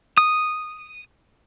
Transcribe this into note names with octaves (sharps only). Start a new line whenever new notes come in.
D#6